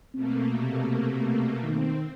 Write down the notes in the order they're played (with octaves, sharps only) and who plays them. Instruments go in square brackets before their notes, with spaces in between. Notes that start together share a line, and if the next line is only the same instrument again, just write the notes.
[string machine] B2 A3 A#3 [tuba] C4
[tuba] C3
[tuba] D#3 [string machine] C4